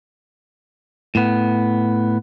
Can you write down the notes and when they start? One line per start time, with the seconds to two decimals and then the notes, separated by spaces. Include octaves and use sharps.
1.15 A2 B3